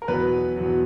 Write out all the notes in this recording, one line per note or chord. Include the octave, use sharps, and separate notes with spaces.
A#4
E2 B2 F#3 B3 B4
E2 B2 F#3